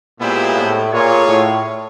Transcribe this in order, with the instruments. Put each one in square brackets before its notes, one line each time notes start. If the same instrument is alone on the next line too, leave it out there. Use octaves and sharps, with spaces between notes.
[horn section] A#2 [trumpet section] G#3 B3 E4 G4 C5
[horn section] A2
[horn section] A#2 [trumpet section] F4 G#4 C#5
[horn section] A2